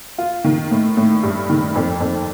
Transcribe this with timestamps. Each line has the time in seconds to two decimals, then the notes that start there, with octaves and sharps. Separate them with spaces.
0.18 F4
0.44 D#3
0.71 A2
0.97 A2
1.23 G2
1.49 D#3
1.76 F2
2.00 F2